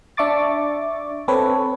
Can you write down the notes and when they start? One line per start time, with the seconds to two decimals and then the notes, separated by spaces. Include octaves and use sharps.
0.17 D4 E5 C#6 D6 A6
1.28 C4 A4 B4 C#5